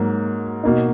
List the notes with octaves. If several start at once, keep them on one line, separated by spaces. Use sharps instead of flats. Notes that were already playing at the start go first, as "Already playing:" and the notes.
Already playing: G#2 F#3 A#3
B2 A#3 D#4